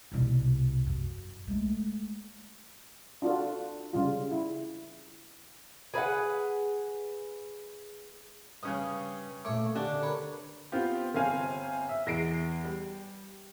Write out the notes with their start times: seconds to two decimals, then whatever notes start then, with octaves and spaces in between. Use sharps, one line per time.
0.12 C2 B2
0.87 F#2
1.47 G#3 A3
3.22 D4 F4 F#4 A4
3.93 C#3 G3 F4
4.31 E4
5.94 G#4 B4 E5 F#5
8.63 G2 C#3 C#4 D#6
9.45 A#2 A3 C#5 D6
9.75 D3 D4 G4
10.03 A#4 B4 C#5
10.72 B3 C4 F4 G4
11.14 G1 C4 F5 G#5
11.89 E5
12.06 E2 A#6 C7 D7
12.64 G3